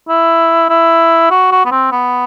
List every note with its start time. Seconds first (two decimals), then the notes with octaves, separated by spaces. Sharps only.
0.09 E4
0.70 E4
1.31 F#4
1.52 F#4
1.65 B3
1.71 C4
1.92 B3